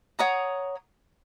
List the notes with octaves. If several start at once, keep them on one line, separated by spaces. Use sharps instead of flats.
C#5 F#5 A#5 D#6